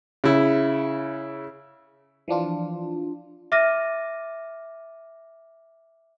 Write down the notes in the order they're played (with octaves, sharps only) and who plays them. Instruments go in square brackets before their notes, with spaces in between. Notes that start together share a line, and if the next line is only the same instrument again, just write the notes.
[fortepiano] C#3 E4
[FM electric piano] E3 F3 D4 F4
[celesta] E5 D6 F6 A6 A#6 D#7